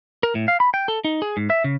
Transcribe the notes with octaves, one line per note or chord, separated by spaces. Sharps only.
A#4
A2
F5
B5
G5
A4
D#4
G#4
G#2
E5
C#3